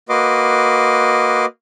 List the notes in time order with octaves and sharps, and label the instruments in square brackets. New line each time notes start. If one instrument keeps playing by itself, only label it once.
[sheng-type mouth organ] A#3 F#4 B4 D#5 C6 D6